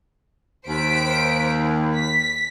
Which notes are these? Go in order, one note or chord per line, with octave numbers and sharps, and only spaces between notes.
D#2 C5 B6 D7
B6